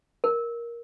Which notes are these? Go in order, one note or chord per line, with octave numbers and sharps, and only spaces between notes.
A#4